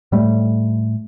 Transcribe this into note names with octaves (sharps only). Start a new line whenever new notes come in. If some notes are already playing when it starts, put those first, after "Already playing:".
A2 G3 A3